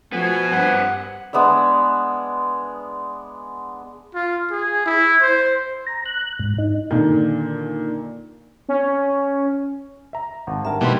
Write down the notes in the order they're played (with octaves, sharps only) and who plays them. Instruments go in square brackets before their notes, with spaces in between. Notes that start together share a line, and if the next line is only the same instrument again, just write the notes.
[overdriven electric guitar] B2 B3 [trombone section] F3 A3 [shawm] G#5
[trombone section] G2 [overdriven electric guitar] C4 B4 [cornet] F#5
[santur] G#3 B3 D4 E5
[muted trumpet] F4
G#4
E4
C5
[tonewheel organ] A#5
F#6
G#2
D#4
[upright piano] A#2 D3 D#3
[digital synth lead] C#4
[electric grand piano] E5 A#5
[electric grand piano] G#1 [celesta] F#5 A5
[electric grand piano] G2 A#4 [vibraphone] E5 A5 [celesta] F#5 G5 A#5
[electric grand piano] G#2 A#3 [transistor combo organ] B2 E3 G3 [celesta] G5 C6